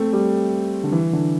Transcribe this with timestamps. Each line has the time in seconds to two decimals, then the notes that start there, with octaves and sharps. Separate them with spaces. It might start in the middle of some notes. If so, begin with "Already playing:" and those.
Already playing: A3 C4
0.13 G3
0.84 D3
0.92 E3
1.13 D3